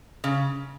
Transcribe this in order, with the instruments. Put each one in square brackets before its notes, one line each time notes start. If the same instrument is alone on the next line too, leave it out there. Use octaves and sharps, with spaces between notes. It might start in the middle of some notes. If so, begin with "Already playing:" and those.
[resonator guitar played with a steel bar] C#3